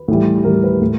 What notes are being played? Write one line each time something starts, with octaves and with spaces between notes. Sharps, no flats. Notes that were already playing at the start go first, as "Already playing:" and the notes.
Already playing: B4
A2 E3 G3
A2 E3 G3 A#4
B4
A2